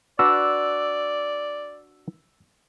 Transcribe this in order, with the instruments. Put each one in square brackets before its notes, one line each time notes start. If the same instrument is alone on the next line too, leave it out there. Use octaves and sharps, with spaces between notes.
[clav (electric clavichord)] D4 F#4 B4 [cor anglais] D5 [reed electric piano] E6